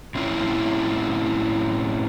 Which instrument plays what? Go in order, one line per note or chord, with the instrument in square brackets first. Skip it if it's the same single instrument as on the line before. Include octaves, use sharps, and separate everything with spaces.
[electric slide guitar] A2 C4 C#4 E4 F4